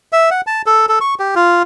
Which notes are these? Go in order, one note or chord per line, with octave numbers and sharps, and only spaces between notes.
E5
F#5
A5
A4
A4
C#6
G4
F4